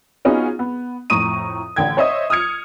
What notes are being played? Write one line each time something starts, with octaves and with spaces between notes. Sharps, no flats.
B3 C#4 D#4 F4 F#4 G#4
B3
F2 A2 A#5 C#6 D#6 D#7
A1 D3 G5 G#6
C5 C#5 D#5 E5 D#6
D#6 F6 G#6 C#7